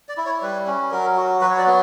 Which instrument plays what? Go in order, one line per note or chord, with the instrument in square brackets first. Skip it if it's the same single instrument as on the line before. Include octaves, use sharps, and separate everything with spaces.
[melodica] D5
E4
C#5
G3 B4
C#4
F#3 A#4
F#4
F#3 B4
C#5
D5
B3